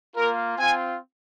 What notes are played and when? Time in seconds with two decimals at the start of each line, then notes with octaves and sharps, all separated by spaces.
0.16 A#3 F4 A#4
0.58 C4 F4 G#5